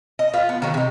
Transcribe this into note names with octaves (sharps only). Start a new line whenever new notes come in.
D#5
F4 B4
B3
D#3 F#3
C3 D#4